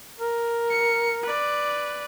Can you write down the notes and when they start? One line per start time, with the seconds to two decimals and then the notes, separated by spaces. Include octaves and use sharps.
0.20 A#4
0.70 C#7
1.23 B4 D5